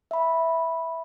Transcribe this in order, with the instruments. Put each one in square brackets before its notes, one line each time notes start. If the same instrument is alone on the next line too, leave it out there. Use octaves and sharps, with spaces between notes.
[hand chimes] E5 B5